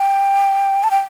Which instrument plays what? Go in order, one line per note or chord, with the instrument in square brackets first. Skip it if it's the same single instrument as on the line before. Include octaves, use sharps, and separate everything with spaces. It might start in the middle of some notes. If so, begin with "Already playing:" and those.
Already playing: [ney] G5
A5
G5